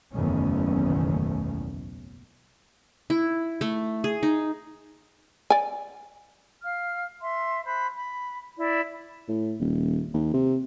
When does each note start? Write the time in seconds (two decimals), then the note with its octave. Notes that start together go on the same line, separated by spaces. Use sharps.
0.15 F#1 B1 E2 D#3 A3 C#4
3.10 E4
3.61 A3
4.04 G#4
4.23 D#4
5.50 D5 G#5
6.63 F5 F6
7.21 E5 C6
7.65 C5 B5 F#6
7.95 B5
8.58 E4 D5
9.28 A2
9.60 D#1
10.14 D#2
10.34 C3